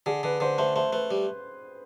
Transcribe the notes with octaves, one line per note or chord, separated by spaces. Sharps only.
D3 G#4
D3 B4
D3 C5
A3 C5
A3 C5
A3 B4
G3